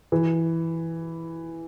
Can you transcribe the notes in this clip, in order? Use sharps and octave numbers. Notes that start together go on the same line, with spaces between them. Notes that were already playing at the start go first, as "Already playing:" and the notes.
E3